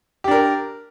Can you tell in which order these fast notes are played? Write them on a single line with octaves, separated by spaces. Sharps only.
G4 D4 A#4